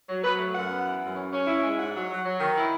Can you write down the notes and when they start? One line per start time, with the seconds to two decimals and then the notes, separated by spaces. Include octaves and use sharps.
0.09 F#3
0.24 F#3 B4
0.39 A3
0.55 F#2 F#5
0.71 B3
0.86 E3
1.01 F#2
1.16 C#4
1.32 C#4
1.47 E4
1.63 G#3
1.78 G#2 F#5
1.94 F#3
2.10 F#3
2.24 F#3
2.40 D#3
2.56 E4